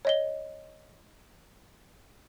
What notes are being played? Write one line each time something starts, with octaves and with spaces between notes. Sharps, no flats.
C#5 D#5 G7